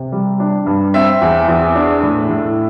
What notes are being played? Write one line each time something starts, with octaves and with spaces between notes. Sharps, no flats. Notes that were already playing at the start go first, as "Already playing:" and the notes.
Already playing: C3
G3
D4
G2
C4 E5
E2
E2
D4
A2
A2